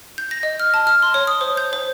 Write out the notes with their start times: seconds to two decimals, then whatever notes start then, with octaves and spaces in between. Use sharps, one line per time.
0.18 G6
0.31 A#6
0.43 D#5
0.60 F6
0.74 A5
0.87 F6
1.02 C6
1.14 C#5
1.27 D#6
1.41 C5
1.57 G6
1.73 C5